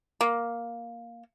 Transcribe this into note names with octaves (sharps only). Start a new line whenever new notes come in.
A#3